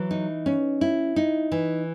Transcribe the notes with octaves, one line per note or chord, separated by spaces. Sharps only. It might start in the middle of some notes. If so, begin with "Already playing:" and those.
Already playing: E3 F#3
D#4
C#4
E4
D#4
E3